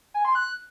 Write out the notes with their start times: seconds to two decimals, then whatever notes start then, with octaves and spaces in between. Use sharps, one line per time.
0.14 G#5
0.25 C6
0.35 F#6